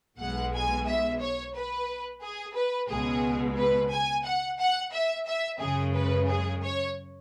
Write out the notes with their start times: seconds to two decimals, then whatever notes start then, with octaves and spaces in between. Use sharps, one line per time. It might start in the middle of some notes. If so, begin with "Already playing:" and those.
0.19 B1 B2 G#3 F#5
0.53 G#5
0.87 E5
1.20 C#5
1.54 B4
2.22 G#4
2.55 B4
2.89 C#2 B2 G#3 G#4
3.57 B4
3.91 G#5
4.26 F#5
4.58 F#5
4.92 E5
5.26 E5
5.60 F#2 C#3 G#3 G#4
5.94 B4
6.28 G#4
6.62 C#5